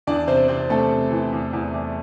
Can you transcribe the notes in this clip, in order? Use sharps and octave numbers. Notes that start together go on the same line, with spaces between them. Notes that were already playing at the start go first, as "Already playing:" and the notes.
E2 D4 D5
C3 C4 C5
C3 C4 C5
C3 A3 A4
C3
E3
E2
E2
E2